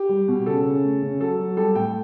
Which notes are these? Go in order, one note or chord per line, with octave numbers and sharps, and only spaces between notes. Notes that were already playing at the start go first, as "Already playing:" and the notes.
Already playing: G4
G3
B2
C#3 A4
C#3
A3
C#3
F#3 A4
F#3
G3 A4
A2 G5